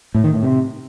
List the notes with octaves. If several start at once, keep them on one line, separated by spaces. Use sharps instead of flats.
A2
D#3
A2
C3